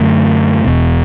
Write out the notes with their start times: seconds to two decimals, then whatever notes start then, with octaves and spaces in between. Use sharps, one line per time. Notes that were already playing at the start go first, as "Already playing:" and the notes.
Already playing: F#2 D3 A3
0.64 E1 E2 B2